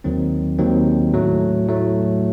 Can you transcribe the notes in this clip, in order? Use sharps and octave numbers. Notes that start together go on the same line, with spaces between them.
D#2 D#3 F#3 C4
D#2 D#3 F#3 C4
A2 F#3 A3
A2 F#3 A3